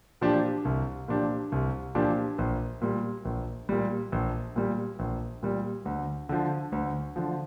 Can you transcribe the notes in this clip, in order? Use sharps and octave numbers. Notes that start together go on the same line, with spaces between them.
A#2 F3 D4 G4
C2
A#2 F3 D4 G4
C2
A#2 F3 D4 G4
A#1
A#2 G3
A#1
A#2 G3
A#1
A#2 G3
A#1
A#2 G3
D2
D3 F3
D2
D3 F3